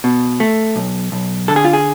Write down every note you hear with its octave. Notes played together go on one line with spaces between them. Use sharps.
B2
A3
B1
B1
D3 A4
G#4
F4
G#4